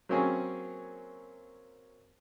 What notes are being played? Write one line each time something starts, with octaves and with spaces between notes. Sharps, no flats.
F#3 A#3 C4 C#4 G#4